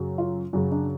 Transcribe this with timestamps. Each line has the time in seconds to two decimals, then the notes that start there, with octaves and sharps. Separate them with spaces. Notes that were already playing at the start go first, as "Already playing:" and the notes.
Already playing: F#2 C#3 F#3
0.18 F4
0.53 F#2 C#3 F#3 F#4
0.71 D4